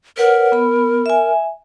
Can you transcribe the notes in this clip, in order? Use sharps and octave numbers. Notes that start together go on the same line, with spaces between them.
A#4 B4 C#5 F#5
B3 B5
E5 G#5